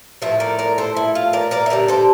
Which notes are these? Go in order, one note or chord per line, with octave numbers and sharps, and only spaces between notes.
A2 F3 A3 E5
A#4 D5
A#4 D5
A4 C5
E4
F4
A#4 D5
A#4 D5
E5
D3 G3 D4 A#4 D5
A4 C5